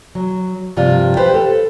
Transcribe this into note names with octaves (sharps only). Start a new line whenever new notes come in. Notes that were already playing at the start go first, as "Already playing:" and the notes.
F#3
G2 C3 F3 G3 F4
G4 B4 C5
A4